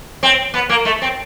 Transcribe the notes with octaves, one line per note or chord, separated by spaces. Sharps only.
C4
B3
A#3
A3
C4